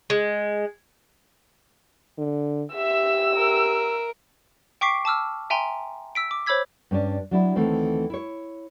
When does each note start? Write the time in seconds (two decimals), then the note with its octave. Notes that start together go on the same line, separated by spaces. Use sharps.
0.10 G#3
2.18 D3
2.75 G4 E5 E6
3.35 A#4
4.81 G5 C#6 D6 B6 C7 D7
5.05 A5 D6 E6 F6
5.50 E5 G5 G#5 A#5 C6
6.15 E6 B6 D7
6.31 D6
6.46 C5 C#5 B5 E6 G#6 B6
6.91 G2 C#4 D4
7.31 F#3 D4 E4
7.55 D2 D#3 E3 A3 C4
8.10 E4 C#5